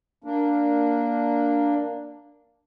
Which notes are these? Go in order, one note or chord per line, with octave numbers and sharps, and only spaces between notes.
A#3 D4